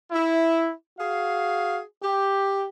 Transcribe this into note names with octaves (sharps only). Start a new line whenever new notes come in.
E4
F#4 G#4 F5
G4